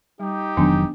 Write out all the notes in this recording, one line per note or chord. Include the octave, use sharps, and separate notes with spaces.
G3 D#4 G4
F1 D#3 E3 F#3 B3 D4